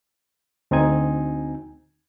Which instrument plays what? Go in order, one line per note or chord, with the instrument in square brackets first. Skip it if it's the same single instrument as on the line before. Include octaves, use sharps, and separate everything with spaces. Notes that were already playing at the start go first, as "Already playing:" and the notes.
[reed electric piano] D2 C4 D#4 G#5